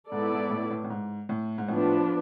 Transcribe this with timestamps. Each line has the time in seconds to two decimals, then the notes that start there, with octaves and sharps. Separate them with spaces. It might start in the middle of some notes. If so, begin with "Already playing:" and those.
0.11 G#2 B3 E4 A4 D5
0.31 G#2
0.50 A2
0.70 A2
0.84 A2
0.90 G#2
1.29 A2
1.58 G#2
1.68 A2 F3 B3 D4